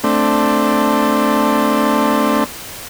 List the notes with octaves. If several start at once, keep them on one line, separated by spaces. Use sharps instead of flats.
A3 C4 D4